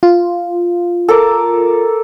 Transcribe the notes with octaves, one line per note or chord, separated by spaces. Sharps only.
F4
A4 A#4 D6